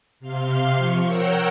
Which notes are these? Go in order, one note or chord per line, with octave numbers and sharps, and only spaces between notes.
C3 F5 C6
F3 C#6
A#4 C#5 F#5 G5 E6